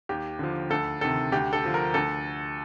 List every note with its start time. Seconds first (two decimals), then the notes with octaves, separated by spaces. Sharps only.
0.09 D#2 G4
0.39 D3 F3
0.70 D2 A4
1.01 C3 D#3 A4
1.32 D2 G4
1.53 A4
1.64 D3 F3
1.74 A#4
1.94 D2 A4